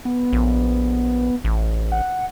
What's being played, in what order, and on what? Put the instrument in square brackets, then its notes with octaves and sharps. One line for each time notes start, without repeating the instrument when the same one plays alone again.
[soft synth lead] B3
[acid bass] A#1
A1
[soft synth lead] F#5